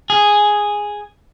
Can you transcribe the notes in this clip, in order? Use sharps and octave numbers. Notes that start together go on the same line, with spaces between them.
G#4